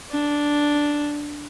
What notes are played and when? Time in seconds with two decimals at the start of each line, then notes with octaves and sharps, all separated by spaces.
0.11 D4